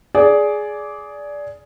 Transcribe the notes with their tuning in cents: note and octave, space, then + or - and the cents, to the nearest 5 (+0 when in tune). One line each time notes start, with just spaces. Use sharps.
G#4 +10 D5 -10